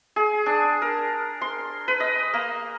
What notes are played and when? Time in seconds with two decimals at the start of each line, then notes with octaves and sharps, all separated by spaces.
0.16 G#4
0.46 D4
0.82 A#4
1.41 C6
1.88 B4
2.00 D#5
2.33 A#3